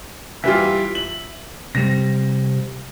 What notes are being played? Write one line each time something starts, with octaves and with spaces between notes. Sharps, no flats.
E3 G3 F4 E5
F#7
C3 G3 C4 A#6